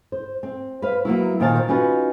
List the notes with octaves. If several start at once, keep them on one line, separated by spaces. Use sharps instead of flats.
C5
C4
B4 C5 F5
F#3 A#3 B3 E4
A#2 D#3 A#4 C5 F5 A5
C#4 D#4 F4 F#4 B4